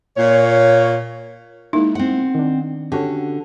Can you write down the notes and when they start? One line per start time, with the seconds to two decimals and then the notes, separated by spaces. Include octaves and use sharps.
0.17 A#2 C#5
1.73 G#3 A#3 D#4 E4
1.95 C4 F#5
2.35 D#3 D4
2.92 D3 C#4 F#4 G4